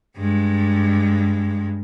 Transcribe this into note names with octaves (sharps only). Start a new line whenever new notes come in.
G2 G#3